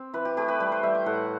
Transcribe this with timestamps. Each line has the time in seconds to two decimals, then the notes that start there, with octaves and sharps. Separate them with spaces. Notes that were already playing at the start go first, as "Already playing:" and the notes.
Already playing: C4
0.14 E3 B4
0.25 G4
0.37 A3 G4
0.48 B4
0.60 G3 B4
0.72 C5
0.83 G3 E5
0.95 G5
1.06 A2 F#5